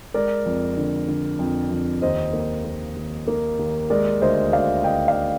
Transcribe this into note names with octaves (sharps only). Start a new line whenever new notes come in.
G#3 A#4 D5
F2
D3
D3
F2
F2
D#2 C5 D#5
A#3
A#3
D#2
A#3
D#2
G#3 A#4 D5
D2 C5 D#5
D2 D5 F5
D2 D#5 G5
D5 F5